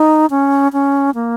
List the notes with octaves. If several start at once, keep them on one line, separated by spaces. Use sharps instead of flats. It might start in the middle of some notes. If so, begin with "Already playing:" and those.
Already playing: D#4
C#4
C#4
A#3